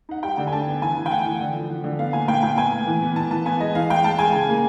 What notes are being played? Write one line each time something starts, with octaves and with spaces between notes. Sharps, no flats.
D#4 F#5
G3 G5
D3
G#5
D4 A5
B3
E3 G#5
E3
G5
A3 F#5
E3
D3
F3
F3
D3
B3 F5
A#2 G#5
A#2 G5
A#2 G5
B3 G#5
A2
E3
B3
E3 A5
E3 A5
B3 G#5
G#3 D#5
E3 F5
G#3 G5
G#3 A5
G#3 G#5
C#3
A#3